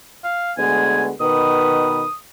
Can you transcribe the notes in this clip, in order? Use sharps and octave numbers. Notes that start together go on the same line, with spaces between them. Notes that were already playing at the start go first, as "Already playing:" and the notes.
F5
D2 G#3 B3 G#5
B2 D#3 B4 D#6